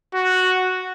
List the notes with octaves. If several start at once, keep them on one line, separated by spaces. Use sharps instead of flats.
F#4